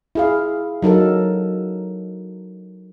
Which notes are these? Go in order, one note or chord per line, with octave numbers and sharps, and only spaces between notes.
E4 G#4 F5
F#3 D#4 A4 A#4